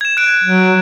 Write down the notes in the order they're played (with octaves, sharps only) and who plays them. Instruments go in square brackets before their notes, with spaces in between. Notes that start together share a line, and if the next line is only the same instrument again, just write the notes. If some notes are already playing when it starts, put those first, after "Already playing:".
[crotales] G#6 E7
F#6 D7
[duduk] F#3